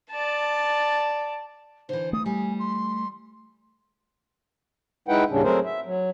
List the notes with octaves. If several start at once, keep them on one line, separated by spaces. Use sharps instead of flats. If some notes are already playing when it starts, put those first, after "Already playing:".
D5 A5
D3 E3 C5
A3 D#6
G3 G#5
C6
G#3 D#4 E4 B4 F#5 G5
D#2 A2 C#3 G3 C#4 D4
F#3 A3 C4 G#4 A#4 C5
E5
F#3